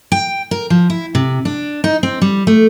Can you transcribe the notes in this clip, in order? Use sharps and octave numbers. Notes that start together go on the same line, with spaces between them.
G5
A#4
F3
E4
C3
D4
D#4
C4
G3
A3